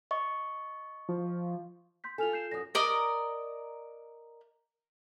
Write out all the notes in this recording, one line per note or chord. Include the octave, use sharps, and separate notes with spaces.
D#5 C#6
F3
C6 G6 B6
F4 A4 G#5 F6 F7
G6 C7 E7
F#2 F#4 D#6 A#6
A#4 D5 D#5 A#5